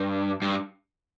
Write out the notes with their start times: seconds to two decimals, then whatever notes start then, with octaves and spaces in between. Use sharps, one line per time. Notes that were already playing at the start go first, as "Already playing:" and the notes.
Already playing: G2
0.42 G2